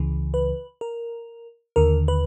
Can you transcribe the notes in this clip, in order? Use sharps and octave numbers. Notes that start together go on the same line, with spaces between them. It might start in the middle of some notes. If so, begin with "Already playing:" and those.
Already playing: C#2 C#3 E3
B4
A#4
D#2 D3 A#4
B4